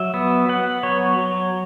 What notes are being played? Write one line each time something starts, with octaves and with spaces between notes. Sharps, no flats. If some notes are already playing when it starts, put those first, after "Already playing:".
Already playing: F#3 E5
B3
B3 F#5
F#3 C#5
F#3